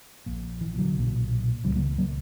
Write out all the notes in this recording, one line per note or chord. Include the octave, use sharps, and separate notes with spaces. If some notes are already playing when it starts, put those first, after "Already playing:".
A#1 A#2
E3
D3 F#3
B1 A#2
C#2 C#3 E3 G3
F#3 A#3
F#3 A#3